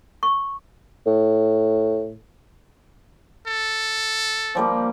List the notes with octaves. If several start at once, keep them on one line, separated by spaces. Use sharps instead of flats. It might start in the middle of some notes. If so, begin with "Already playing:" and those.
C#6
A2
A4
F3 G3 A#3